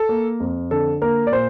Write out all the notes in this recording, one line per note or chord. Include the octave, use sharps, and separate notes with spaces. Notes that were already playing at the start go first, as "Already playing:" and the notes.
Already playing: A4
A#3
F2
D3 A4
A#3 A#4
D5
A#2 C5